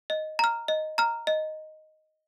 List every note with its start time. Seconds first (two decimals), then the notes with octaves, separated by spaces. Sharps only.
0.10 D#5
0.39 A#5 F6
0.68 D#5
0.98 A#5 F6
1.27 D#5